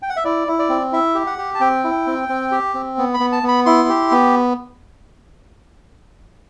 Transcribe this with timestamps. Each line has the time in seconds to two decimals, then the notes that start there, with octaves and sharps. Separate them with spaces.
0.02 G5
0.10 F#5
0.16 E5
0.25 E4 D5
0.48 E4
0.59 D5
0.69 C4
0.93 E4 E5
1.15 G4
1.27 F#5
1.38 G4
1.55 A5
1.60 C4 G5
1.84 E4
2.07 C4
2.29 C4
2.51 G4
2.74 C4
2.98 B3
3.14 B5
3.20 B3
3.32 A5
3.43 B3
3.48 B5
3.66 E4 C6
3.89 G4
4.12 B3